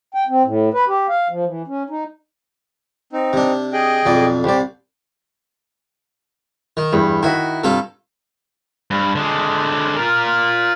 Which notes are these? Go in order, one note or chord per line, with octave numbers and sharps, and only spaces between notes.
G5
C4
A2
B4
G4
F5
F3
E3
C#4
D#4
C4 D#4
C3 D4
G#4 D#5 G5
B1 F2 D5
C2 G4 C5 D5
D#3
E2 G2
D#3 E4 F#4 E5
G2 C3 F4 A4
G2
D3 G#3
F4 A#4